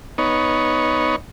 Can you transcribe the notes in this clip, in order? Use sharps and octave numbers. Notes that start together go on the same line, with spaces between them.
B3 D#4 C#5